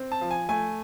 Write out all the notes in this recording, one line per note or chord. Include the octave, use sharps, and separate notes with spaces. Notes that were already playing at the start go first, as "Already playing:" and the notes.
Already playing: C4
A5
F3
G#5
A3 G#5